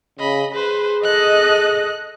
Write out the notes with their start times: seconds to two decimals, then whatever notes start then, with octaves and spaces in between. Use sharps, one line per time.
0.20 C#3 D#5 B5
0.55 G#4 B4 C5
1.04 A4 D#5 F#6